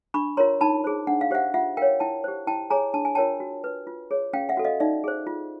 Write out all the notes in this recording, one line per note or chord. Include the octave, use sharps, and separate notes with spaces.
D4 B5 C#6
F4 A#4 C#5 A#5 C6
D#4 A5 B5
G#4 C5
D4 F#5
F5
G4 C5 E5 F#5
F4 E5 F#5
A#4 C#5 F5 G5
E4 G5 A5
G4 C5
E4 G5 A5
G#4 C#5 G#5 A#5
D4 A5
G#5
F4 A#4 C#5 G5 A5
F#4
B4
F4
G#4 C#5
C#4 F5 G5
E5 F#5
F#4 A4
D#5 F5
D#4 D5 E5
G#4 C5
F4